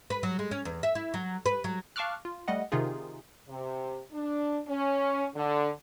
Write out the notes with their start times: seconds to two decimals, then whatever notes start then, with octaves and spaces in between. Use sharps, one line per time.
0.10 B4
0.23 F#3
0.39 G#3
0.51 C#4
0.65 E2
0.83 E5
0.95 E4
1.14 F#3
1.46 B4
1.64 F#3
1.96 F5 A5 C#6 D6 F6 F#6
2.25 F4
2.48 G3 A3 D#5 F#5
2.72 C3 D#3 D#4 F4 G#4
3.49 C3
4.12 D4
4.68 C#4
5.35 D3